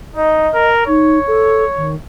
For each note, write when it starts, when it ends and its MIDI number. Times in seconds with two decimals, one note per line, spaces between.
0.16 0.48 63
0.16 0.71 75
0.54 0.85 70
0.87 1.19 63
0.87 1.92 73
1.27 1.64 69
1.76 1.95 51